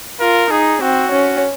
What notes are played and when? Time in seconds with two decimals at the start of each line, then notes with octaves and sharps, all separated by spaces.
0.20 F4 A#4
0.51 D#4 G#4
0.81 C4 F#4
1.11 C#4